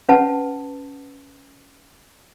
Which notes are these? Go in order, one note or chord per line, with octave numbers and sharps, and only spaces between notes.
C#4 B4 F#5 A5